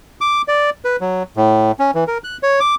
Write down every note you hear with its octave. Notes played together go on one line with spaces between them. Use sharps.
D6
D5
B4
F#3
A2
C#4
E3
A#4
F#6
C#5
D6